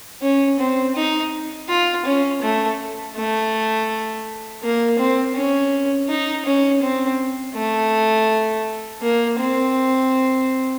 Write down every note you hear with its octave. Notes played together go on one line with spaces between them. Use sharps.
C#4
C4
D#4
F4
C#4
A3
A3
A#3
C4
C#4
D#4
C#4
C4
A3
A#3
C4